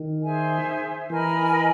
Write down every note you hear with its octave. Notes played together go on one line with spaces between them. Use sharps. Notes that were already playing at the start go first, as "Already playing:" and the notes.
Already playing: D#3
G#4 C5 E5 G#5
E3 A#4 D#5 G#5 B5